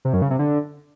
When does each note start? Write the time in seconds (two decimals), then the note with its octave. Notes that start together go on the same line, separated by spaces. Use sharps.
0.05 C3
0.13 F#2
0.22 C#3
0.31 C3
0.39 D3